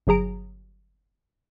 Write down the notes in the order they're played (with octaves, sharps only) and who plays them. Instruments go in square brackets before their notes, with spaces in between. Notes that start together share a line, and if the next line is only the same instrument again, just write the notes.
[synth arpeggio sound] G1 F#3 G#4 A#5 D7